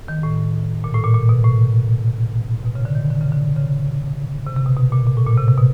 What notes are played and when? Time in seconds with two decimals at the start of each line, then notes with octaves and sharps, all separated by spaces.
0.08 D#3
0.23 A2
0.84 A#2
0.94 A2
1.04 A#2
1.14 A#2
1.29 B2
1.44 A2
2.65 B2
2.75 C#3
2.85 D3
2.95 D#3
3.10 D3
3.21 C#3
3.32 D3
3.56 C#3
4.47 C3
4.57 C3
4.66 B2
4.77 B2
4.92 A#2
5.07 A#2
5.17 A2
5.27 A#2
5.37 C3
5.48 C3
5.58 B2